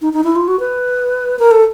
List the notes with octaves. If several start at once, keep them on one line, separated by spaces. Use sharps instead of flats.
D#4
D#4
E4
F4
F#4
B4
A#4
A4